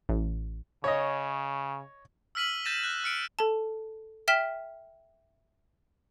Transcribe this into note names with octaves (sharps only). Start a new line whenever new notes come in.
A1
C#3 C#5 D#5
E6 F6 B6 D#7 F#7
G6 A6 A#6 D#7 E7
F#6
F6 C#7 D7
A4 A5
E5 G5 F6 B6 E7 G7